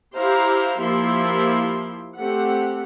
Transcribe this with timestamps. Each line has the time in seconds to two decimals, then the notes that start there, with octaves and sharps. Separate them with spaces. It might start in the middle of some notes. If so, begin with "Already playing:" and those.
0.14 E4 G4 C5 F5 A#5
0.79 F3 A#3 E4 G4 C6
2.16 A3 C4 G4 F#5